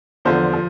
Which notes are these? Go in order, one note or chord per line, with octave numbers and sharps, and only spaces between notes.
E2 D3 F3 C5
F3